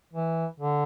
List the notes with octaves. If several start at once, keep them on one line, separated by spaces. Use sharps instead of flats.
E3
D3